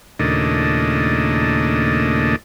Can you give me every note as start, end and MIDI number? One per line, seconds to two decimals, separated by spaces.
0.19 2.36 39
0.19 2.36 46
0.19 2.36 49
0.19 2.36 57
0.19 2.36 62
0.19 2.36 75